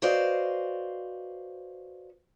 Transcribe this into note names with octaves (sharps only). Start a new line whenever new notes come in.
F#4 B4 C5 D5 D#5 F5